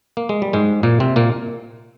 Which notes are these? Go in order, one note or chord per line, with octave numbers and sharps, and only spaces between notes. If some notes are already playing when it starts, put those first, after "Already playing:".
A#3
G#3
G3
G#2 G#3
A#2 A#3
C3 C4
A#2 A#3